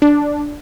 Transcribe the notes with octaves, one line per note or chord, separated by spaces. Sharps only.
D4